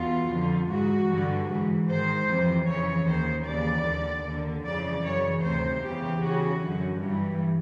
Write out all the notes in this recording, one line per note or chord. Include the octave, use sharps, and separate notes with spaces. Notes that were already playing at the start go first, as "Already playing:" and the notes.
Already playing: E2 B2 F4
F2 D3
G#2 E3 F#4
G2 D3
G#2 E3
G#2 D#3 C5
F2 C3 E3
F2 C#3 E3 C#5
D#2 D#3 C5
D#2 C#3 E3 D5
D#2 D3
D#2 D3
F2 C#3 E3 D5
F#2 C#3 E3 C#5
D2 C3 D#3 C5
E2 C#3 E3 G4
E2 C#3 E3 F#4
F#2 D3
G2 E3